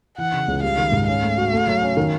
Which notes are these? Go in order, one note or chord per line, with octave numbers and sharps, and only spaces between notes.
E3 F#5
C#3
C#2
G3 F5
D#3
G#2
C#4 F5
A3
F#4
A3
F#3
C#4
D#3